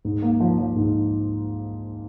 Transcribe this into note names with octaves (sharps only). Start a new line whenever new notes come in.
G#2
A#3
F3
F3
G#2